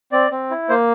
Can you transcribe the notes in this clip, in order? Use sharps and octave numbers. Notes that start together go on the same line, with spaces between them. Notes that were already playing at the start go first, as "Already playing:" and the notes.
C4 D5
C4
E4
A#3 C5